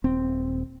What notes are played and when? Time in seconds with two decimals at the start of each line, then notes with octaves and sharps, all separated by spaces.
0.04 D#1 C4